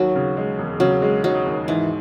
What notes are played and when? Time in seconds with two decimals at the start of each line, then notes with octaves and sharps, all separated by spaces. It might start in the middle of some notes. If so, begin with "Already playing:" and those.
Already playing: D#2 F#3
0.15 C#3
0.37 G#3
0.59 E1
0.80 C#3 F#3
1.02 G#3
1.24 F#3 D#4
1.46 D#2
1.68 G#2 E3